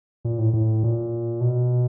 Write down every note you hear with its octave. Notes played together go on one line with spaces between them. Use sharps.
A#2
A2
A2
A#2
B2